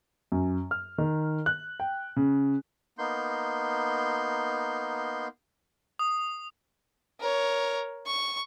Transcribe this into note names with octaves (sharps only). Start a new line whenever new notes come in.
F#2
F6
D#3
F#6
G5
C#3
A#3 B3 D#4 C6 G6
D#6
A#4 C#5
C#6